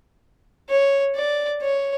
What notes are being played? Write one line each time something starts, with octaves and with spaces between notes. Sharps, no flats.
C#5
D5
C#5